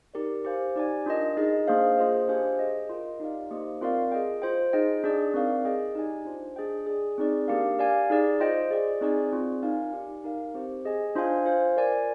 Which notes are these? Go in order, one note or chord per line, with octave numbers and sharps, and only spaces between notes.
D#4 G4 A#4 D5
G4 C5 F5 G#5
D#4 G4 D5 G#5
D4 F4 A#4 D#5
D#4 G#4 D#5
A#3 D4 G#4 C5 F5
A#3 F4 G#4 C5 D#5
D4 G4 C5 F5 G#5
G#4 D#5 G5
F4 A#4 D#5 G5
D#4 G4 D5 F5
A#3 D#4 G4 C5 D#5
C4 F4 A#4 D5 F5
G#4 D#5 G5
F4 C5 G5
D#4 G#4 D#5 G5
D4 G#4 D5
C4 D#4 A#4 D5 F5
G#4 D#5 G5
D#4 G4 D5 G#5
D4 F4 C5
D4 G#4 D#5 G5
G#4 D5 G#5
C4 D#4 G#4 D5
A#3 D4 G4 A#4 F5
G4 D5 F5 G#5
D#4 G#4 D5
F4 C5 D#5 G5
G#4 D5 G5
C4 D#4 G#4 D5 G#5
C4 F4 G#4 D5
D#4 A#4 F5 G#5
D#4 G4 D5 G#5
D#4 A#4 F5
C4 G4 C5
G#4 D#5 G#5
D4 F4 C5 F5 G#5
F4 C5 F5 G#5
F4 A#4 D5 G#5